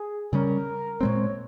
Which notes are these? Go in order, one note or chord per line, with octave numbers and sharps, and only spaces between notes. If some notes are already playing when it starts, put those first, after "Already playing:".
Already playing: G#4
C#3 G3 C#4 A#4
A#2 G#3 C4 C#5